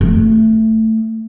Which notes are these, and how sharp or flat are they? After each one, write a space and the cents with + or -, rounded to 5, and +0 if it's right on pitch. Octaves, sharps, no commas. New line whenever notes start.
A3 +10